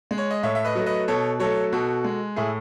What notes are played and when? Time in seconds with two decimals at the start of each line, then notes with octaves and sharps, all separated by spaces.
0.11 G#3
0.18 C#5
0.30 D#5
0.43 A2 C#5 E5
0.55 E5
0.64 B4 D#5
0.75 F#3 A3
0.86 B4 D#5
1.08 B2 A4 C#5
1.40 F#3 A3 A4 C#5
1.72 B2 F#4 A4
2.05 G#3
2.36 A2 E4 G#4